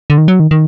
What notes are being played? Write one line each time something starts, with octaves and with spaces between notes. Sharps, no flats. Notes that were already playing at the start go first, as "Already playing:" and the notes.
D3
D#3
F#3
D#3
D#3